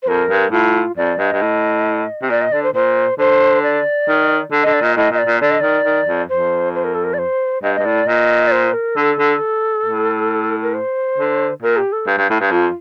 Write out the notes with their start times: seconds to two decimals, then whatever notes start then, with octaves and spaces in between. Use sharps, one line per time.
0.02 C5
0.08 F2 A#4
0.29 G2
0.52 A2 F4
0.97 F2 D5
1.18 G2 D#5
1.33 G2
1.42 A2
2.22 C3
2.30 A#2 D5
2.41 D#5
2.52 D3 D5
2.63 C5
2.74 A#2 C5
3.18 D3 C5
3.63 D5
4.08 D#3
4.52 D3
4.63 D3 D#5
4.73 D5
4.82 A#2 D#5
4.96 A2 D#5
5.11 A#2 D#5
5.18 D5
5.27 A#2
5.41 D3 D5
5.50 D#5
5.60 D#3 D5
5.85 D#3
6.07 F2
6.29 F2 C5
6.75 C5
6.84 A#4
6.94 A4
7.04 A#4
7.14 D5
7.18 C5
7.63 G2 D#5
7.75 G2 D#5
7.85 A2 D5
8.07 A#2 D#5
8.47 D5
8.52 C5
8.73 A#4
8.96 D3 A4
9.19 D3
9.86 A2
10.62 A#4
10.74 C5
11.18 D3
11.63 A#2 A#4
11.77 G4
11.92 A4
12.07 G2
12.18 G2
12.30 A2
12.41 G2
12.51 F2 F4